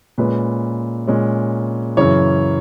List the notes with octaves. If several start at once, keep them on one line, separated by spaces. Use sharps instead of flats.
A#2 G#3 C#4 B4
A#2 G#3 C#4
F#2 C#3 E3 C#5